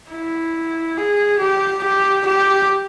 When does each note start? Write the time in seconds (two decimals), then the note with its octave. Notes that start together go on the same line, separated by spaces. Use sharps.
0.11 E4
0.97 G#4
1.39 G4
1.83 G4
2.26 G4